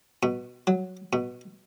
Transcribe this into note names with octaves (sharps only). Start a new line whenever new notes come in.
B2
F#3
B2